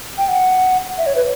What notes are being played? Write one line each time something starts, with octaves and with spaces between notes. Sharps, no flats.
G5
F#5
E5
C#5
B4